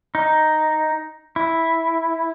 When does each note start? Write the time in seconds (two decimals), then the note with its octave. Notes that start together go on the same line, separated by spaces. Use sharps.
0.15 D#4
1.36 E4